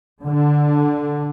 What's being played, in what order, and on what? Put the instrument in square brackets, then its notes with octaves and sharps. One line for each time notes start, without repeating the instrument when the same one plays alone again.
[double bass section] D3